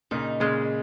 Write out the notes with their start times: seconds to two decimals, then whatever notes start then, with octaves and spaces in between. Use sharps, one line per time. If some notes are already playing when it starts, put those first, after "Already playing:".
0.11 A#2 C#3 D#4
0.40 A#2 C#3 G#3